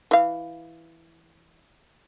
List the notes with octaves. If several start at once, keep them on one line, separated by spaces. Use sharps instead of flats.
E3 F5